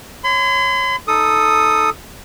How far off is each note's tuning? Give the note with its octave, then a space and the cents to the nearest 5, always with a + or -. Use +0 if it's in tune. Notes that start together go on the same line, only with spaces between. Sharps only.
C#5 -5 C6 -45
D#4 +0 A4 +0 D#6 +0